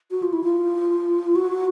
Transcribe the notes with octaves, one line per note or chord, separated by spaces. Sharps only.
F#4
F4
E4
F4
F#4